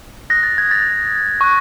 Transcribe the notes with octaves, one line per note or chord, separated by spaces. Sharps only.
D#6 F#6 A#6
A6
G#6
A6
C#6 F#6